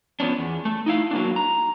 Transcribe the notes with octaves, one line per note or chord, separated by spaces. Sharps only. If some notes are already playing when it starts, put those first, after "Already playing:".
F3 B3 C#4 D4
E2
A3
D#4 E4 F5
F#3 A#3 D4
A#5